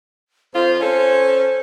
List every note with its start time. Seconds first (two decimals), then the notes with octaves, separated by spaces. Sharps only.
0.54 F2 F4 C5
0.80 C#4 A4 C5